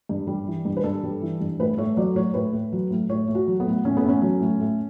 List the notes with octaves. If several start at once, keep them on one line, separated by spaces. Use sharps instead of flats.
G2
G3
E3
G2
B4
G2 A4
G3
E3
G2
A2 B4
A3 C#5
F#3 D5
A2 C#5
A2 B4
A3
F#3
A2
A2 C#5
A3
F#4
F#3
B3
A2
A2 C#4
B3
A3 C#4
F#3
A2
A3